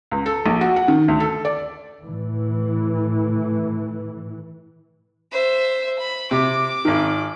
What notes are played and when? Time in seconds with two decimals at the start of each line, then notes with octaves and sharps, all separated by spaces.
0.11 C#2
0.26 A4
0.46 A#1
0.61 F#4
0.76 F#5
0.88 D#3
1.08 D2
1.20 A4
1.45 D5
2.04 A2 E3
5.31 C5 E5
5.98 B5
6.31 C3 D6
6.85 G#1 D#3